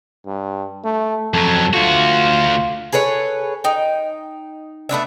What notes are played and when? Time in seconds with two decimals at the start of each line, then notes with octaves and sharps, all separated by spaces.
0.26 G2
0.84 A3
1.34 F2 F#3 A4
1.74 D2 F4 F#4
2.92 G#4 A4 B4 C#5
3.64 D#4 G5
4.89 A3 B3 D4 E5